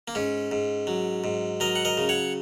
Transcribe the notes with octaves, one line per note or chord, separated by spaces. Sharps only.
A#3
G#2 C#4
G#2
F#3
G#2
F#3 A#4 D#5
F#5
A#4 D#5
C#3
C#5 F#5